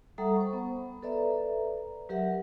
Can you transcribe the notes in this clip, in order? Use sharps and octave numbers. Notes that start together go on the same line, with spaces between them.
G3 A4 E5 F#5 A#5 D#6
C5 C#6
B3
A4 B4 D5 E5 A#5
F#3 G4 A#4 E5 F#5